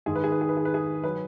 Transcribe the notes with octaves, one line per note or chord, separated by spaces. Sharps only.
G#2 D#3 G#3 G#4
B4
G#4
B4
G#4
B4
G#4
B4
G#4
F#3 B4